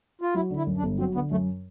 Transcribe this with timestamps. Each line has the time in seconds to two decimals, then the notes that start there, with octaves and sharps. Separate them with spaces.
0.22 F4
0.34 F#3 E4
0.50 D3
0.56 E4
0.67 F#2
0.77 D4
0.83 G1
0.98 F#3 C4
1.15 D3 B3
1.31 F#2 A3